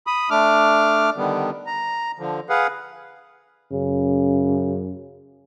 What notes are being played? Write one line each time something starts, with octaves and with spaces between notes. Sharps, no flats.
B5 D#6
A3 D4 D6 F6
D3 D#3 G3 B3
A#5
D3 F3
G#4 B4 F5 F#5
F#2 C#3